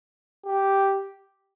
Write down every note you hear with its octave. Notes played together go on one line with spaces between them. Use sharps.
G4